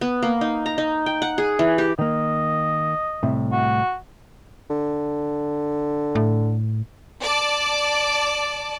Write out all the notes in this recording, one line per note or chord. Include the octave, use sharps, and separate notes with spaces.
B3
A#3
D#4
A#5
D#4
G5
F#5
G#4
E3
G4
D#3 A#3 D#5
C2 A2 C3
F#4
D3
A2
D5 A5